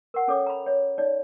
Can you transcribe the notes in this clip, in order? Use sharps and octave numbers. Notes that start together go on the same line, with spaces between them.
A#4 F#5
C#4 A4 C#5 D6
A#5 B5
C#5 E5
D#4 C#5 D5